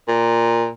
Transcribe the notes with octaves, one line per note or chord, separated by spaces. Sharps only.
A#2